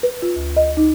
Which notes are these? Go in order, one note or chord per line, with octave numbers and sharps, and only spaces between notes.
B4
F4
D2
D#5
D#4